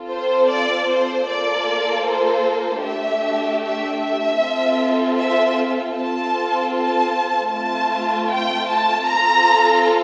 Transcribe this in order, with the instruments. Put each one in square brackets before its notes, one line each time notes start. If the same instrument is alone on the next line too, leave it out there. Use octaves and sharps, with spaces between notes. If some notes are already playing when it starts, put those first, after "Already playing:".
Already playing: [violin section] C4 F4 A4
C5
D5
C5
A#3 F4 A4 D5
C5
A3 D4 G4 E5
E5
E5
C4 F4 A4
E5
C4 F4 A4 A5
A5
A3 C4 F4 A5
G5
A5
C4 F4 A4 A#5